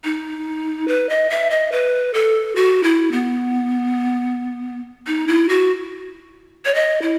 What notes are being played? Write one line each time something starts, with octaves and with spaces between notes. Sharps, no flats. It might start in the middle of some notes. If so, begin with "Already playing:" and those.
D#4
B4
D#5
E5
D#5
B4
A4
F#4
E4
B3
D#4
E4
F#4
C#5
D#5
E4